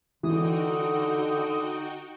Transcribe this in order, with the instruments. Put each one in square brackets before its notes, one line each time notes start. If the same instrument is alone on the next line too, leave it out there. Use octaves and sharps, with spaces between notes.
[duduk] D3 [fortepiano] E3 [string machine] D#4 F#4 G5 [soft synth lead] D#6